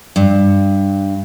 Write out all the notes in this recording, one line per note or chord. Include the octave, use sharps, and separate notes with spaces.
G2